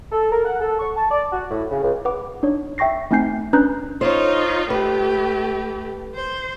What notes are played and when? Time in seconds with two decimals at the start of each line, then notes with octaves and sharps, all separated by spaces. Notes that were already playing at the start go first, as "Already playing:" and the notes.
0.12 A4
0.32 A#4
0.45 F#5
0.60 A4
0.79 C#6
0.96 A5
1.11 D5
1.32 F#4
1.51 A2
1.71 C#3
1.83 C#2
2.05 B4 F#5 D6
2.43 D4 D#4 C#5
2.78 E5 G5 C#6 A#6 C7
3.11 A3 C4 D#4 G#5 G6 C7
3.53 C#4 D4 B4 A#5 F#6 G6
4.01 D#4 F4 C5 C#5
4.70 A3 G4 B4
6.15 C5